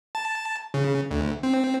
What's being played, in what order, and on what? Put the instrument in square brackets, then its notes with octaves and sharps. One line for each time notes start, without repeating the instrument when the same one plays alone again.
[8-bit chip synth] A5
C#3
D2
C4